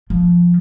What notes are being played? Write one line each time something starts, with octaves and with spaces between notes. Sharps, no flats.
F3